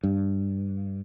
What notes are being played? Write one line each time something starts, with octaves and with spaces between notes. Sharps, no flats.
G2